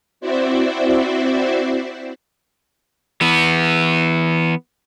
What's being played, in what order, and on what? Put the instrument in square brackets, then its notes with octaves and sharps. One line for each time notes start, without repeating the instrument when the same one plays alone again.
[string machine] C4 E4 F#4 C5 D5 E5
[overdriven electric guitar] E3 B3